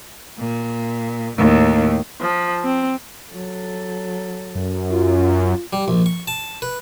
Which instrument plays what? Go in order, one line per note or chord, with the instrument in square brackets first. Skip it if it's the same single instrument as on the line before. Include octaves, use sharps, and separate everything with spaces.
[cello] A#2
D#2 A2
[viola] F3
C4
[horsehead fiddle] F#3 A4
[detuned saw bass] F#2
[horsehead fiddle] F4
[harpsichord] G3
A#1
C#6
A5
B4